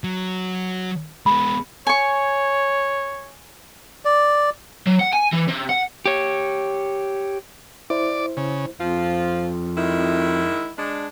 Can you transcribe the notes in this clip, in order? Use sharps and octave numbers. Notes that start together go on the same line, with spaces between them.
F#3
G#3 B3 B5
C#5 G#5 C#6
D5
F#3
F#5
G#5
E3
C3
F#5
G4 C#5
E4 C5 D5
C#3
F2 F3 F4
D#3 G#3 E4
G#3 D4